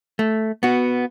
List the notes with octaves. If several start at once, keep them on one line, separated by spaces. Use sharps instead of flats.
A3
B3 F#4